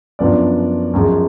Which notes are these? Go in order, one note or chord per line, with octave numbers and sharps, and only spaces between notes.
F#2 F3 B3 D4 F4 D5
F#2 F3 G#3